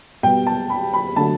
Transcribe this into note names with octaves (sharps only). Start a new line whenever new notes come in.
B2 G3 B3 G5
A5
B5
B5
D3 F#3 A3 A5